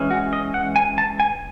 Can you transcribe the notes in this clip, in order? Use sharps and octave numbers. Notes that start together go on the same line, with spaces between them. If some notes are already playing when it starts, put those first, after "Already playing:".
Already playing: E3 G#3 C#4
F#4
D#5
F#5
G#5
A5
G#5